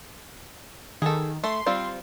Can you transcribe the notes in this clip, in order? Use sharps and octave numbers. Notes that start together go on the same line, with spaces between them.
D#3 G#4 A4
A3 C6
G3 C4 F4